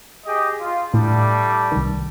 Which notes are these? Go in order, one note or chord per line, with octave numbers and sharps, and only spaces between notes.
G4 G#4 D#5
F4
A2 G3 A3 D4
C2 D#3